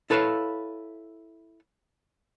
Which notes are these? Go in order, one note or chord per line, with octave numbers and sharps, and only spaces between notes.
E4 A4 B4 C#5 E5 F5